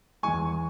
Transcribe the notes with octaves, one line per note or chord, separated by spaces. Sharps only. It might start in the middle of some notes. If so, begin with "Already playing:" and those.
E2 E3 G#3 G#5 C#6